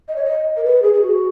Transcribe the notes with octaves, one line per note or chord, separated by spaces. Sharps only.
D#5
C#5
D#5
A#4
B4
G#4
G#4
F#4